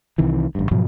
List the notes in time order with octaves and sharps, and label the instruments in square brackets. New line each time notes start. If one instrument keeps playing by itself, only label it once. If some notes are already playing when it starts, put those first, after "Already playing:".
[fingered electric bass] C2 C3 D#3 E3
A1 G2
G#2 B2 F3 F#3